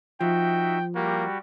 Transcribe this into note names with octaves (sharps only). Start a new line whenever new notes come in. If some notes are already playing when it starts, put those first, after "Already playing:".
F3 D#4 F#4 E5 G5
G3 A#3 F#4 G4